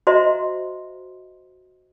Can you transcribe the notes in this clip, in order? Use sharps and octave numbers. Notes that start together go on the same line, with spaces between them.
F#4 C5 D#5 E5 A#5 C6